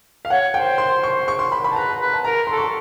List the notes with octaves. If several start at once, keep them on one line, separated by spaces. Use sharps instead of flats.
F5
C#5 F#5
C5 G5
C6
C#6
C#6
C6
B5
B5
A5
B4 A#5
B4
A5
A#4 A#5
A4 C6
C#6